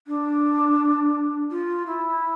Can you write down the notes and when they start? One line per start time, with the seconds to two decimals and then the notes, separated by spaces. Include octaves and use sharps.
0.07 D4
1.51 F4
1.87 E4